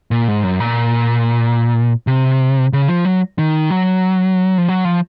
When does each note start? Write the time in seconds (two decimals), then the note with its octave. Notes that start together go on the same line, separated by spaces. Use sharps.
0.11 A#2
0.28 G#2
0.44 F#2
0.60 A#2
2.07 C3
2.73 C#3
2.88 F3
3.05 F#3
3.38 D#3
3.70 F#3
4.58 F3
4.68 F#3
4.85 F3